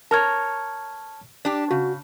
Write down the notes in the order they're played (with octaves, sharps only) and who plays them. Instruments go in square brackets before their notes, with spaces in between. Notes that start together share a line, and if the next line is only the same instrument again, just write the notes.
[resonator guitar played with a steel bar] A#4 C#5 [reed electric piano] A5 F6 G#6
[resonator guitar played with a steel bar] D4 G4
[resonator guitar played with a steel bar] C#3 [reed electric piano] F#4